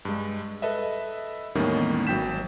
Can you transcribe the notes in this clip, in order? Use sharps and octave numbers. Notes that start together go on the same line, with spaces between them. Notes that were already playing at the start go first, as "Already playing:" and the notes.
G2 G#3
A4 B4 D#5 E5
E2 A2 D#3 G3 A#3 C#4
G#1 F#3 G5 G6 B6 E7